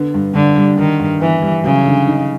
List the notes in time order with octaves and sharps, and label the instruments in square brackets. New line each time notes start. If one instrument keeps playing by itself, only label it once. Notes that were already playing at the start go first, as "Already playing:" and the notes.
Already playing: [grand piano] D3 B3
G2
[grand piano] G2 [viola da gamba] D3
[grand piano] G3
[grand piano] D3 [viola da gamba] D#3
[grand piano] G2
[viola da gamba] E3 [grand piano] B3
[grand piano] G3
[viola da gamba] C#3 [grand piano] F#3
[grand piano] D3
D#4